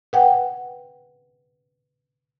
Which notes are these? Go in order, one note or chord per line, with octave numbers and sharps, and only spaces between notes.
B4 F#5 G5